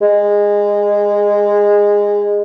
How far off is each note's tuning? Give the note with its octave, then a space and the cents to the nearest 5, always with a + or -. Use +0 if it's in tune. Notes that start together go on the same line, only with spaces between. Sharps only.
G#3 -20